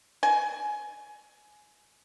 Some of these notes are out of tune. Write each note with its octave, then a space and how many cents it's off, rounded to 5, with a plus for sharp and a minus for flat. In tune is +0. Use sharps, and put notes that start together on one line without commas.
G#5 +15